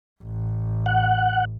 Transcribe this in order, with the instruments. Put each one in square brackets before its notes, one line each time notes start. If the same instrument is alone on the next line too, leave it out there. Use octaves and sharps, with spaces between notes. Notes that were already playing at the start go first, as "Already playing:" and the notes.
[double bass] A1
[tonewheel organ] F#5